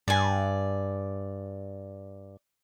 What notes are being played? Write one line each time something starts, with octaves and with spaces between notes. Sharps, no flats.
G2 D5 G#5